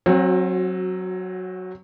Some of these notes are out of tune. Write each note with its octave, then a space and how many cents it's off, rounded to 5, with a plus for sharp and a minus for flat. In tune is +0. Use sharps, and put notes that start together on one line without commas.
F#3 +0 C4 +30 F#4 -20